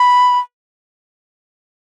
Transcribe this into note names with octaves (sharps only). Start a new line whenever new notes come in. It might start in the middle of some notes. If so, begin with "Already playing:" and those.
Already playing: B5